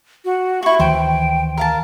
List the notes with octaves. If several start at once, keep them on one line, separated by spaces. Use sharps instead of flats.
F#4
E4 F#4 C#6
D2 D#3 E3 C5 G5
A#4 F5 A5